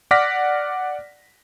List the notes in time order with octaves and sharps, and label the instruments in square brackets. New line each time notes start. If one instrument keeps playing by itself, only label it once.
[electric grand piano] D5 F#5 D6 F6 A#6 B6